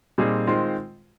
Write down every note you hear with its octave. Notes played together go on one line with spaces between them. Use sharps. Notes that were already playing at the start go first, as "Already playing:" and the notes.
A#2 G3 C4 D#4 G#4
D#3 G#3 C4 F4 C5